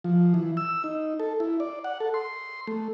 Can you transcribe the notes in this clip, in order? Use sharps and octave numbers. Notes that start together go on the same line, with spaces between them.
F3
E3
E6
D#4
A4
E4
D5
F#5
A4
C6
A3